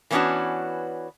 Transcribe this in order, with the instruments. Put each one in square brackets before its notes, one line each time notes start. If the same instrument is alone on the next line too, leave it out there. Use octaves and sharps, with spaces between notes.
[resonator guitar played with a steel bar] E3 A3 B3 C#4 D4 F#4